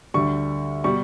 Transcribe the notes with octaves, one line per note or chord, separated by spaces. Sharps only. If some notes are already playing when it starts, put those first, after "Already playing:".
D2 D3 G3 C#6
B2 G3 C#6